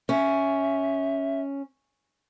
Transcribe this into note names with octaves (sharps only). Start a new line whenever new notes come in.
C#4 E5